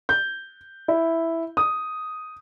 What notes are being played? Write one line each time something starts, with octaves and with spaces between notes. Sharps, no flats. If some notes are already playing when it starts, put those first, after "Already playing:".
G6
E4
D#6